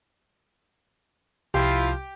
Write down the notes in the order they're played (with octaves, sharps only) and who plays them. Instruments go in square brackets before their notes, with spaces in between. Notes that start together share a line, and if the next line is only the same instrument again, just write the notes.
[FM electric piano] C2 [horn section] F3 E4 F4 [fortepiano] G4